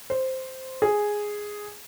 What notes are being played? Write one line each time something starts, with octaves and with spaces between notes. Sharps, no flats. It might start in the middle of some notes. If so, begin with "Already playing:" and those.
C5
G#4